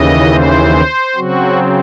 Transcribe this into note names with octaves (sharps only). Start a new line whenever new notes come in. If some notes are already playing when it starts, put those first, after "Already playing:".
Already playing: D#2 C#3 E3 D#5
C5
C#3 F#3 C4 F#4